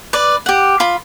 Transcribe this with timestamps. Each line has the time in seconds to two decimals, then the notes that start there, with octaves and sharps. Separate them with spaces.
0.13 B4 D5
0.46 G4 F#5
0.80 F4 B5